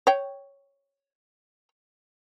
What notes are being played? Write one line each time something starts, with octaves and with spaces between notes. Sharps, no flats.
C#5 G5